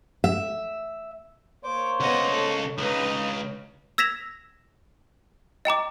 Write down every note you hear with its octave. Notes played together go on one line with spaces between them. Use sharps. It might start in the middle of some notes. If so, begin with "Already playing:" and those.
E5
A#3 C5 C#5 D6
C#3 B3 D#5 F#5
A4
C#2 D#4 B4 D#5
E6 G#6 A#6 B6 E7 F7
D#5 G5 A#5 D6